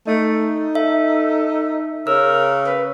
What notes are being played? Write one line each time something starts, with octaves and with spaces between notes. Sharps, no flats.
A3 D#4
A4 E5
C#3 A#4 E6
B4